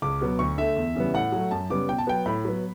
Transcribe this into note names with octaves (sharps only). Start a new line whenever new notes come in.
C#2 D6
B2 F#3 B3
D2 C#6
D3 A3 E5
E2
C#3 E3 G3 B3
A2 F#5
F#3 A3
F#2 A5
C#3 G3 B3 D6
B2 G5
A5
F#3 B3 G5
A2 B5
F#3 B3